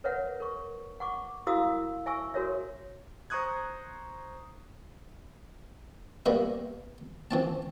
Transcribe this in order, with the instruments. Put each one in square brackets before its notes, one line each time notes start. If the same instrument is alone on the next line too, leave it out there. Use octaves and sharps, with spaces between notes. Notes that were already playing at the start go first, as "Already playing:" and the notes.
[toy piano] A#4 B4 C#5 E5 F#5
A#4 C#6
F#5 C#6 D6
E4 F#4 A#4 F5 D#6 E6
E5 G#5 C#6 E6
F#4 A#4 C#5 E5
[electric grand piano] C5 A#5 C#6 D#6 F#6 G#6
[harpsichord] G3 A#3 B3 B4 E5
E3 C4 A5